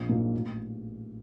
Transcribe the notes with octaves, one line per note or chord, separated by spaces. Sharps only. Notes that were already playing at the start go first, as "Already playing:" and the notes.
Already playing: A#1
A#2 F#3 A#3 D#4
A1